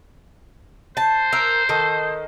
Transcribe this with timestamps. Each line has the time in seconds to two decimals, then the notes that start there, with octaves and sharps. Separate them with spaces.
0.97 C5 A5
1.32 A#4 E5
1.69 D#3 A4